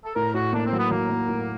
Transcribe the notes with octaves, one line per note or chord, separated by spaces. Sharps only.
A4
A2 A#4
A2 F#4
A#3 D4
C4
F#3
B3
F#3 A#3
F#3
A2